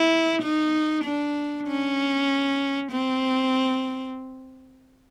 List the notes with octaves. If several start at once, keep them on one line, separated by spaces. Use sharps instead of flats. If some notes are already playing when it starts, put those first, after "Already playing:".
Already playing: E4
D#4
D4
C#4
C4